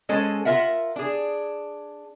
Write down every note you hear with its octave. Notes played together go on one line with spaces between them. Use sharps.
G#3 C#4 A4 C5 D#5
F4 A#4 E5 F#5
D4 G#4